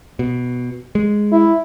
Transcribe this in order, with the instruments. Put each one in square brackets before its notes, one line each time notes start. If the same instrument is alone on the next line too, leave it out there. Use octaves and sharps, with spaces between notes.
[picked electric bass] B2
G#3
[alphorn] E4